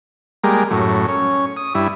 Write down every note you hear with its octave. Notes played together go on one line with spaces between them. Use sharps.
G3 G#3 A#3
F#2 A2
C#4
D#6
G2 E4